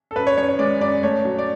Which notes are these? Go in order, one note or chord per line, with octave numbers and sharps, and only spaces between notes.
A4
F#2 B4
C#5
F#2 C#5
C#5
G#3 D5
F#2 D5
A3 C#5
F#3
D5